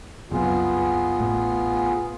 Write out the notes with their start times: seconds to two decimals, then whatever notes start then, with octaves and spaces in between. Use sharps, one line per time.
0.31 F#1 C2 F#2 B3 F4 G#4
1.20 A1 A2